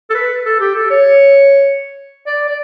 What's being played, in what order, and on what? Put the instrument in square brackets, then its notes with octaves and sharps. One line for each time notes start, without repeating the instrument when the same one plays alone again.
[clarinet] A4
B4
A4
G4
A4
C#5
D5
D5